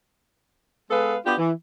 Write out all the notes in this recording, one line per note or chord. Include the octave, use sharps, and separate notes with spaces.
G#3 B3 A4 B4 F5
B3 D4 F4 G4
E3